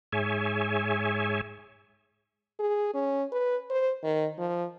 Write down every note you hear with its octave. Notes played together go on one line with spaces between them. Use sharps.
G#2 G#4 C#5 E5 G#5
G#4
C#4
B4
C5
D#3
F3